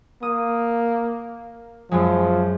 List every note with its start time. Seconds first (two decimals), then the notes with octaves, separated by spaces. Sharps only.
0.23 A#3 D#6
1.91 F#2 F3 F#3 G#3